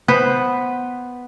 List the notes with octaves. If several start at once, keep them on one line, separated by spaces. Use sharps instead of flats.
B3 B4 C5